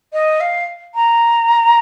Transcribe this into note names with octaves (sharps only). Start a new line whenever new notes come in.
D#5
F5
A#5